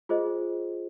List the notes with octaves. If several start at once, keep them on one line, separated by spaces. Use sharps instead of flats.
F4 G#4 C5 D#5